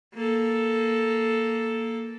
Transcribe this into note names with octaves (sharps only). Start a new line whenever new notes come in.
A#3 A4